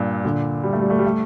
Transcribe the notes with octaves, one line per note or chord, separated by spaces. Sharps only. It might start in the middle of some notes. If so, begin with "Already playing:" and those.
Already playing: G2 A#2
A#2 D3
G3
A3
G3
A3
G3
A3